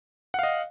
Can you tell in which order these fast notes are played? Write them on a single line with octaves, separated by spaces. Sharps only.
F#5 F5 D#5